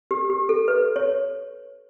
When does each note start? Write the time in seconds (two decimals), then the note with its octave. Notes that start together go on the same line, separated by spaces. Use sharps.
0.11 G4
0.30 G4
0.49 A4
0.68 B4
0.96 C#5